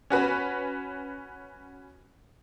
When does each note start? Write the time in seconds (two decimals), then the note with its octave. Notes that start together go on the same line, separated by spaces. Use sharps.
0.10 C#4 F#4 B4